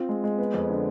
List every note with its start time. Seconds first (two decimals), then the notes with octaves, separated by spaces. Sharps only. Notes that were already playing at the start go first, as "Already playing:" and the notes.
Already playing: C4 F4
0.09 G#3
0.24 G#3
0.38 B3
0.54 F2
0.70 D3